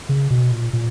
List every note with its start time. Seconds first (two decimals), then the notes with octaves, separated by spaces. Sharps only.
0.09 C#3
0.30 B2
0.51 A#2
0.73 A#2